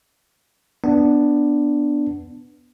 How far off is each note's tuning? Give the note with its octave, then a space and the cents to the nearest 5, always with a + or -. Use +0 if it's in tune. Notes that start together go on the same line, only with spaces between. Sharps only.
B3 +0 D4 +0